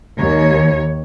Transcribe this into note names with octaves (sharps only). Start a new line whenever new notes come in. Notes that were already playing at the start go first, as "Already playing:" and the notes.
D#2 C#5